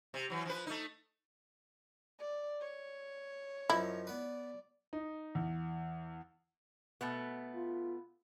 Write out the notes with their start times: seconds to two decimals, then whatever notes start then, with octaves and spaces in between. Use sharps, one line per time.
0.14 C3
0.30 E3 F#3
0.45 F3 B4
0.67 A3 D#4
2.19 D5
2.61 C#5
3.70 F#2 F3 D#4 E4
4.07 B3 B4 D5
4.93 D#4
5.35 E2
7.01 B2 A3 B3
7.55 F4